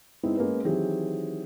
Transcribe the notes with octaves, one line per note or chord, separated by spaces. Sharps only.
G#3 B3 C4 D#4 E4
G#3 A#3 B3 C#4 B4
D#3 E3 F#3 C4 G4 G#4